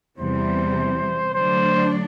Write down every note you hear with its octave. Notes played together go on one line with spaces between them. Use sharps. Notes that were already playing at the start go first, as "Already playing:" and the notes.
E2 C3 E3 G3 C5
D3 F#3 A3 D4 C5